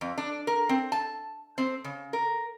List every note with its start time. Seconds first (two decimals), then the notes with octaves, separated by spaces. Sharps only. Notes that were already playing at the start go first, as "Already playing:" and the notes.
0.01 F2
0.18 D4
0.47 A#4
0.69 C4
0.92 A5
1.58 C4
1.84 C#3
2.13 A#4